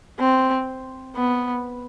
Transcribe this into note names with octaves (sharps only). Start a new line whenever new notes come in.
C4
B3